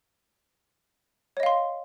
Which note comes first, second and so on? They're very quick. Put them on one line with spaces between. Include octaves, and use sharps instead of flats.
C#5 D#5 F5 C6